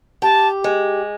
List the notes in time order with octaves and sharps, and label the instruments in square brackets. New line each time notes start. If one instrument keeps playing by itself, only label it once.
[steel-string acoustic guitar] G4 [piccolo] A5
[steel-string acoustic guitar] G#3